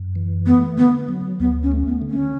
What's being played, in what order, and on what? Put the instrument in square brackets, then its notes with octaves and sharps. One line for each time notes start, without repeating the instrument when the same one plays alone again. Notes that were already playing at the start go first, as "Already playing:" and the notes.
Already playing: [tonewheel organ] F#2
E3
[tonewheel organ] A3 [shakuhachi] B3
[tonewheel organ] D3 [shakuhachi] B3
[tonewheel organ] F#3
[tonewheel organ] D2 [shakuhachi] B3
[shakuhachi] C#4
[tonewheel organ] A3
[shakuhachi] B3
[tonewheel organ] D3
[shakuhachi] C#4